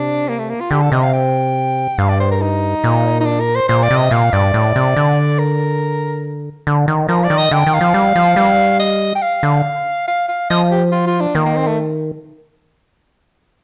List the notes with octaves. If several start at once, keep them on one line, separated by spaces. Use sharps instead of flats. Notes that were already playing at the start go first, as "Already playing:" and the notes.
Already playing: C3 D4
A#3
A3
A#3
F4
D3 G4
A4
C3 D#5
F5
G5
G2 F5
D5
C5
A#4
D#4
A#2
D#4
D4
A#4
C5
A#2 C5
D5
C3
D#5
A#2 F5
G2 D5
A2
C3
D3
A#4
D3
D#3
F3 A#4
D5
D#3
D#5
D3 G5
D#3
F5
F3
G3
F3
G3
D#5
G5
F5
D3
F5
F5
F3 D#5
G4
F4
F4
D4
D#3 A#3
A#3
C4
A3